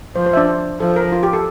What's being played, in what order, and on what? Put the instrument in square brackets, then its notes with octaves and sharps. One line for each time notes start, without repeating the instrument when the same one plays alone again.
[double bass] F3 [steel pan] C5
[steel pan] C5
E5
D4 D5
C5
[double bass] F3 [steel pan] A4
[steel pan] A#4
F4
G4
A4